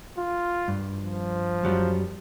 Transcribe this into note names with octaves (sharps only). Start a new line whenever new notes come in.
F4
G2
F3
F#2 F#3 G3